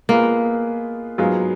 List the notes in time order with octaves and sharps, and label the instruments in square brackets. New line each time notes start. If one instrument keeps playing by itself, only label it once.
[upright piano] G#3 B3 F4 G#4 B4 [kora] A#3
[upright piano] G#2 F#3 B3 F4 G#4